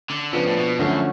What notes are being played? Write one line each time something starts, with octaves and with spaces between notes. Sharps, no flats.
D3
C#3 F3 B3 D4
A2
B2
F#2 D3 F3 A3 C#4